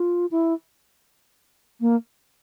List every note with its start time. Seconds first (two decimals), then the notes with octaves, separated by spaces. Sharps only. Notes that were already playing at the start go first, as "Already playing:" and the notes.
Already playing: F4
0.31 E4
1.81 A#3